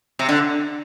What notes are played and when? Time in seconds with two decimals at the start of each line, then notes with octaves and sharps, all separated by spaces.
0.19 C3
0.29 D3